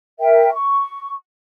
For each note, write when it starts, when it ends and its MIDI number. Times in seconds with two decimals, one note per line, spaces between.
0.20 0.50 70
0.20 0.50 76
0.20 0.50 79
0.53 1.13 85